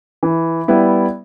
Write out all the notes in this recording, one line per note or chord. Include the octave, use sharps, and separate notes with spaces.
E3
G3 B3 E4